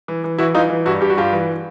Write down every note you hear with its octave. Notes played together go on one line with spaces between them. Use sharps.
E3
E3
E3 E4 F#4
E3 D#4 F4
E3
G2 E4 F#4
G2 G4
F#4
G2 F4 G4
E3